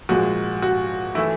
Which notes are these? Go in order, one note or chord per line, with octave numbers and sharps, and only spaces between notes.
A#2 F3 G#3 F#4
F#4
E3 A3 E4